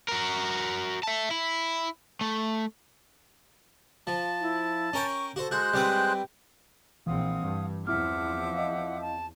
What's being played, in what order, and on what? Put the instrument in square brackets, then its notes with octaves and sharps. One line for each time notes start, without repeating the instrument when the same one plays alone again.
[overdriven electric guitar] F#4 A#4
E5 A5
E4
A3
[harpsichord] F3 [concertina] A5
[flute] E4
[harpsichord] C#4 A#4 G5 [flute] C#6
[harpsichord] F#4 C5 [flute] A4
[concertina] G#3 C5 F#6 [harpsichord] F#4
[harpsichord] G3 C4 B4 [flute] G5
[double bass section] A#1 C4 [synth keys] E3 [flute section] F5 F#5 D#6
[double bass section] G2
[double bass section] E2 F3 [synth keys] C4 E4 [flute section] E5 F#5 D6 [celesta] F6
[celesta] D#5 F5
[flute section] A5